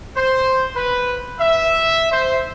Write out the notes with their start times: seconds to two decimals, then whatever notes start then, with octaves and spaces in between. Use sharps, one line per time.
0.16 C5
0.75 B4
1.39 E5
2.11 C5